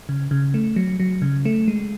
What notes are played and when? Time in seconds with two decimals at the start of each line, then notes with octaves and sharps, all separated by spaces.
0.09 C#3
0.31 C#3
0.54 A3
0.76 F#3
1.00 F#3
1.22 C#3
1.45 A3
1.68 G#3